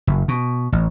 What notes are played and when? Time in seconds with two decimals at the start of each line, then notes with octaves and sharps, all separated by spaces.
0.07 F#1
0.28 B2
0.72 A1